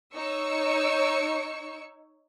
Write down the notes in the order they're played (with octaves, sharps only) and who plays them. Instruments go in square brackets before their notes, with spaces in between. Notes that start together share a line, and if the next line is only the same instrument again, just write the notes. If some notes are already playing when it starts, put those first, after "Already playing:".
[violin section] D#4 C#5 C#6 E6 C#7